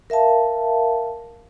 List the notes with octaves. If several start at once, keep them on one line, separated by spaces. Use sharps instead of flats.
A#4 E5 F5 A5